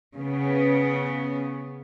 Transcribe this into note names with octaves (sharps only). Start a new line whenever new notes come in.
C#3 B3